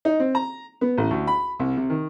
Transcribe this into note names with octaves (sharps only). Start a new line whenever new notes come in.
D#4
C4
A#5
B3
A1
D2
B5
C2
C3
D#3